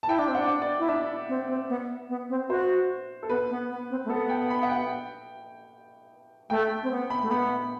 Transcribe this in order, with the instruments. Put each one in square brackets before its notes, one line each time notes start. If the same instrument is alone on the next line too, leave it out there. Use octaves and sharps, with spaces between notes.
[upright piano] A5
[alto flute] E4 [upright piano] G5
[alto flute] D4
C4
[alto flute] D4 [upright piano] F#5
[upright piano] D5
[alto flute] E4
[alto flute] D4 [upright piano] E5
[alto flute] C4
C4
B3
B3
C4
[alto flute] F#4 [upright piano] C5
[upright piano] A4
[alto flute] B3 [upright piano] B4
[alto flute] B3
B3
C4
A3
[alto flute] B3 [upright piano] A4
[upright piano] G5
B5
F#5
G5
[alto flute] A3 [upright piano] G5
[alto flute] C4
B3
[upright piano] B5
[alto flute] A3
[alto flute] B3 [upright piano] B5